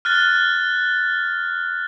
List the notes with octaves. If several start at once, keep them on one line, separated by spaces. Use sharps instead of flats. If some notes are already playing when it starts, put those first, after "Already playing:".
F6 F#6 A6